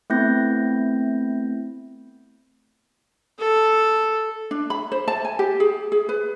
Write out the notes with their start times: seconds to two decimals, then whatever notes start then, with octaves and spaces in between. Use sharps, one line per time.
0.10 A3 B3 C4 E4 G6 A#6
3.39 A4
4.51 D4
4.70 B5
4.92 C5
5.08 A5
5.25 G#5
5.39 G4
5.60 G#4
5.92 G#4
6.09 B4